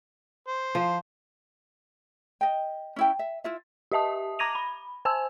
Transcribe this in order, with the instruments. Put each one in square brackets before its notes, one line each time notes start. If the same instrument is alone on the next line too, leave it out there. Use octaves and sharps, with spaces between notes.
[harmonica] C5
[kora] F3
[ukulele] D#5 G5
C#4 E4 G5
E5
E4 F4 E5
[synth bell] G4 D#5 E5 A5 D#6
A#5 D6 G#6 A#6 D#7 F7
B5
C5 G#5 A5 E6